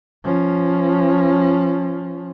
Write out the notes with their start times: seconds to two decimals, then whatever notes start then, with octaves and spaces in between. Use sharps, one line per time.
0.24 F3 C#4